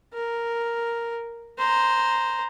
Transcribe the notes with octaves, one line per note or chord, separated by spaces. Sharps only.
A#4
C5 A#5